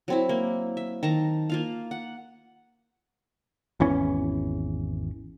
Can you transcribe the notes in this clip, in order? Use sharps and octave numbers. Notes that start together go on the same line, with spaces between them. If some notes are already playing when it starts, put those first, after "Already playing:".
F#3 C4 E4
A#3
E5
D#3 A5 A#5
A#3 F4 F5
F#5
G#1 E2 E3 C#4